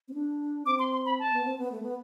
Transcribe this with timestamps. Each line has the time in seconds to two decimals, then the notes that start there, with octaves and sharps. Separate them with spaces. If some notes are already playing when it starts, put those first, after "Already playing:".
0.08 C4
0.14 D4
0.66 C4 D6
0.79 C6
0.92 C6
1.06 B5
1.19 A5
1.32 B3
1.45 C4
1.58 B3
1.72 A3
1.83 B3